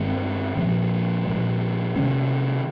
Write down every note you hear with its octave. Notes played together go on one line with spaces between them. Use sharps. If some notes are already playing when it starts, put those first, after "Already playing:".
Already playing: G2 D#3 G#3 C4
A#2 F3 G#3
A#2 F3 G#3
C3 D#3 G#3 C#4